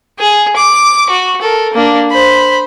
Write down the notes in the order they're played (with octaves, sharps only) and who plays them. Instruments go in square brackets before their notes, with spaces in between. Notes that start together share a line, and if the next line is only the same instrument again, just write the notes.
[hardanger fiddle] G#4
D6
F#4
A4 A#4
A#3 D4
C5 B5